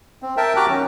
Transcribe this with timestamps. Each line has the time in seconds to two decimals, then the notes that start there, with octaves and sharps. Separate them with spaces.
0.22 C4
0.37 A#4 E5 G5 A5
0.56 F#4 G4 G5 A#5 D6 F#6
0.69 D#3 F#3 C#4